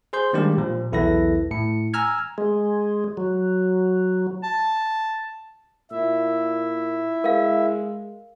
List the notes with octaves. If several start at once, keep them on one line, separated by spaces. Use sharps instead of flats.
G#4 C5 C6 G6
D#3 G3 G#3 A#3 D4 G4
A#2 F3
B1 E2 E4 A4 B4 A#6
A2 C#7
G#5 A#5 E6 F6 G#6
G#3
F#3
A5
A#2 E4 E5
G#3 A#4 F5